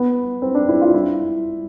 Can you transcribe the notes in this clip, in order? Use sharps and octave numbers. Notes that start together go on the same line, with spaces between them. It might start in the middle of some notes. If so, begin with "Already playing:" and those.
Already playing: B3
C4
D4
E4
F4
E4